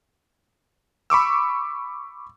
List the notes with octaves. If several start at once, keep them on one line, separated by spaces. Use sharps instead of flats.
B5 C#6 D6 E6